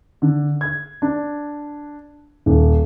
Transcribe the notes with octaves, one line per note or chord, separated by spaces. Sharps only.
D3
G#6
D4
D#1